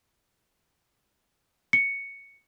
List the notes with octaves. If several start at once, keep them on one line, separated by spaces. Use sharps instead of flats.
C#7